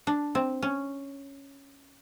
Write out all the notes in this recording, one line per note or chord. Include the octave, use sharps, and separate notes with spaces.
D4
C4
C#4